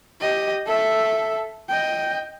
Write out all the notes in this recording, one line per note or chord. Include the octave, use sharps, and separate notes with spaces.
G4 D#5
A4 E5
D#5 G5